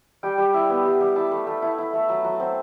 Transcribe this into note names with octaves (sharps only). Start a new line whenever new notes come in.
G3 G5
G3
E4
B3
G3
G3
E4 A5
A3
A3
E4
E4
A3
F#3 A5
F#3
C4